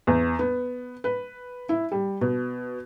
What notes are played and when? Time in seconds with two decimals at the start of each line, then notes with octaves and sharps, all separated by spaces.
0.07 E2
0.39 B3
1.04 B4
1.69 E4
1.92 G3
2.21 B2